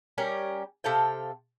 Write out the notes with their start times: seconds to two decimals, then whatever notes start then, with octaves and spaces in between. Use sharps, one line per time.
0.18 G3 C#4 G4 A#4
0.84 C3 A4 F5 G5